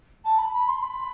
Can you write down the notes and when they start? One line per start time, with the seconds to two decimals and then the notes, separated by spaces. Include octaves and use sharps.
0.24 A5
0.38 B5
0.53 B5
0.68 C6
0.82 B5